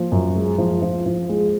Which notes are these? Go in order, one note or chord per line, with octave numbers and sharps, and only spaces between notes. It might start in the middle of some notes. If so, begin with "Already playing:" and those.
Already playing: F3 A#3
F#2
G#3
F3
F3
F3
G#3